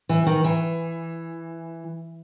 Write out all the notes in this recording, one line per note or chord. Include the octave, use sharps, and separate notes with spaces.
E3
D#3
E3